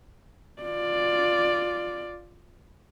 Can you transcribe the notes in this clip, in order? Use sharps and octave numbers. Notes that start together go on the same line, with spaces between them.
F4 D5